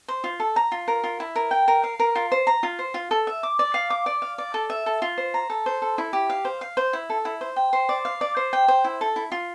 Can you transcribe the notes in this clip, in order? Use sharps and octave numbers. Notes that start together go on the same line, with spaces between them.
C5
F4
A4
A#5
F4
A#4
F4
E4
A#4
G5
A#4
F5
A#4
F4
C5
A#5
F4
C5
F4
A4
E5
D6
D5
F5
D6
D5
F5
D5
A4
E5
A4
F4
C5
A#5
A4
C5
A4
E4
G4
F5
C5
F5
C5
E4
A4
E4
C5
G5
C5
D5
F5
D5
C5
G5
C5
E4
A4
E4
F4